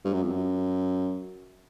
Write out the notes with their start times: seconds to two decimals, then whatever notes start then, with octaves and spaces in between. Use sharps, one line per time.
0.05 G2
0.13 F#2
0.23 F2
0.31 F#2